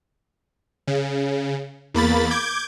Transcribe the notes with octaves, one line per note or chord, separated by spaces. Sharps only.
C#3
E2 A#3 B5 A6
D6 G6 G#6